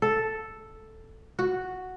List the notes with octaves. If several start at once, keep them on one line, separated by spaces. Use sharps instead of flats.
A4
F#4